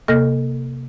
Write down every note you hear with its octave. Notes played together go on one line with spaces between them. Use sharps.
C3 A#3 A4 D#5 F6 A#6